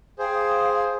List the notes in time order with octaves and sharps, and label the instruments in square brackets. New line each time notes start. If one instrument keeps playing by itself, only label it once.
[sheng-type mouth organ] G#4 C5 [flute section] F5 G5 D#6